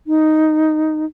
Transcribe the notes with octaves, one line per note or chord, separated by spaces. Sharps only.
D#4